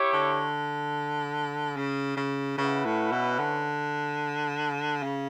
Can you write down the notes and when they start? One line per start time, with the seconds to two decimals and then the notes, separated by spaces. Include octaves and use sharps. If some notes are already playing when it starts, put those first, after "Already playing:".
Already playing: E4 G4 C#5
0.13 D3
1.76 C#3
2.17 C#3
2.58 C#3 C#4 E4 B4 F#5
2.85 A2
3.12 B2
3.39 D3
5.02 C#3